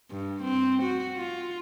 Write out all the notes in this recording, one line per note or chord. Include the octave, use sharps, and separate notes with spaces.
G2
C4
F#4
F4